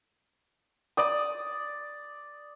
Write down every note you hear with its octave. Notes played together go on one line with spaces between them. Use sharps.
D5 D#6